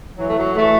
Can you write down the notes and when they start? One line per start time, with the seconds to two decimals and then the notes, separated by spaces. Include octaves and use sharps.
0.18 E3 F#3
0.28 A3
0.37 F#3
0.56 E3 A3